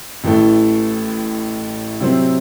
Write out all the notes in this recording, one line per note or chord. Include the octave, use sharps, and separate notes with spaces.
A1 A2 E3 A3
C3 F#3 C4